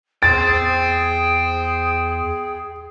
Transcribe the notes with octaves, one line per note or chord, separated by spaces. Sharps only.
E2 G#4 G5 C6 A6